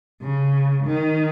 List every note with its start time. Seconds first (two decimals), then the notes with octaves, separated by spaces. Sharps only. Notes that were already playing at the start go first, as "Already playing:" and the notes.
0.22 C#3
0.85 D#3